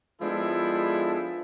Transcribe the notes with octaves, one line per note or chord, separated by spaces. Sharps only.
F3 G#3 B3 D4 E4 A4